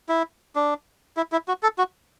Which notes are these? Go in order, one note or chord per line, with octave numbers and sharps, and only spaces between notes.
E4
D4
E4
E4
F#4
A4
F#4